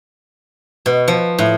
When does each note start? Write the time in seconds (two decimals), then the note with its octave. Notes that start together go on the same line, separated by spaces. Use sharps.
0.86 B2
1.08 F3
1.39 A2